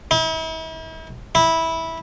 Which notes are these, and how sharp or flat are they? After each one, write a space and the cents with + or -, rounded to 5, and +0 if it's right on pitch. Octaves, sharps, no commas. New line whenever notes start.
E4 -45
E4 -15